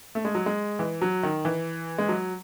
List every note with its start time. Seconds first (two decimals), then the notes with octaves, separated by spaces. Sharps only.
0.15 A3
0.25 G#3
0.35 F#3
0.46 G#3
0.79 E3
1.02 F#3
1.23 D#3
1.45 E3
1.98 G#3
2.09 F#3